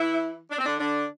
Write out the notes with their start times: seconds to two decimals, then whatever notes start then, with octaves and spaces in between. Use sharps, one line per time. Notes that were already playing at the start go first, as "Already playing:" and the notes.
Already playing: E3 E4
0.51 D4
0.58 C4
0.65 D3 D4
0.79 D3 D4